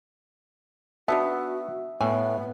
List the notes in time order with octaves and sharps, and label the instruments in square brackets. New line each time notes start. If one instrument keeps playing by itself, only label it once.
[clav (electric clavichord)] B3 [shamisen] D4 D#4 A5 [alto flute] F#4 [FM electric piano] E5
[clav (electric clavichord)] A2 [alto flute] B3 [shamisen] G#5